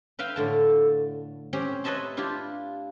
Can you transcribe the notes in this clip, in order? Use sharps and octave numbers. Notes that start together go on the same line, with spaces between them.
B4 E5 F5 G5
A2 D3 A5
C4 C#4 G4 C5
B4 C#5 D#5 E5 A5 C6
D4 E4 F4 G4